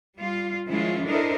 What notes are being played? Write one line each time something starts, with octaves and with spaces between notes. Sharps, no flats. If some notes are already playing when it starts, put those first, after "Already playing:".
G3 F4
D#3 F3 G#3 C#4 E4 F4
D4 E4 A4 A#4 C5 D#5